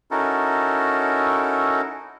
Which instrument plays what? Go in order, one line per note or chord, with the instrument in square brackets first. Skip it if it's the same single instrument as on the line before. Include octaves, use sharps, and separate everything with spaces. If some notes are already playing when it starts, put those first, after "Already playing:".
[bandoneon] C#4 D#4 E4 F#4 A4 A#4